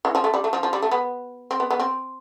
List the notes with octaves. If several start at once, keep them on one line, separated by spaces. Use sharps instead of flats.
E3
F3
A3
G3
A3
F3
F3
G3
A3
B3
C4
B3
B3
C4